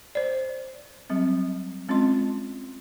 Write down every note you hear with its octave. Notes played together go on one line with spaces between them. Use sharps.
C5 D5
F#3 G3 C4
G#3 C4 C#4 F4 D#5 C6